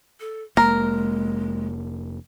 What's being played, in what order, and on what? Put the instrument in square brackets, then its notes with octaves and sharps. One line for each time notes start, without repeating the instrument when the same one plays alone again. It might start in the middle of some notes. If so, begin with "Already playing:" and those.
[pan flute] A4
[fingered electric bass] F1 A#3 [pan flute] G#3 [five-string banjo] A#4